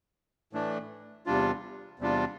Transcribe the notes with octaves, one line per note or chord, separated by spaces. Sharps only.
A2 E3 A3 D4
E2 C3 G3 D4 F4
E2 C3 G3 D4 F4